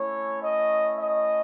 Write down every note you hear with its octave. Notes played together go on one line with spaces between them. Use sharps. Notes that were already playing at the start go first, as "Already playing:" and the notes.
Already playing: A3 C#4 E4 C#5
D#5
D#5